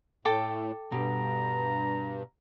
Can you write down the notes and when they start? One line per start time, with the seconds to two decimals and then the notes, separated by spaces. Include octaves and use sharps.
0.25 A2 A4 G5 D6
0.92 G2 B2 G4 A#5